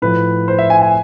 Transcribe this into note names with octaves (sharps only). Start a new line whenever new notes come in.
A2 F3 B4
C5
E5
G#5
G#5